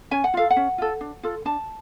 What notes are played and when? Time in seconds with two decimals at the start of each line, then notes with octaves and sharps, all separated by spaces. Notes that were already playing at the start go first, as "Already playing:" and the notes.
0.11 C#4 G#5
0.24 F#5
0.34 F4 A4 F5
0.50 F#5
0.56 C#4
0.78 F4 A4
1.01 D4
1.23 F4 A4
1.45 D4 A5